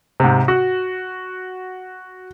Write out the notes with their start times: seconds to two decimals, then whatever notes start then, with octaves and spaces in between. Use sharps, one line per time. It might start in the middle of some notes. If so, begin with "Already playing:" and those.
0.20 G#2 C3
0.48 F#4